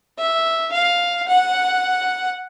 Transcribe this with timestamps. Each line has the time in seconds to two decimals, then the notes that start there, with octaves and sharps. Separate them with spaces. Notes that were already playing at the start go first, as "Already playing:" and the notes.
0.18 E5
0.72 F5
1.28 F#5